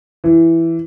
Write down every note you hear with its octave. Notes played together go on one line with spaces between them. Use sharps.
E3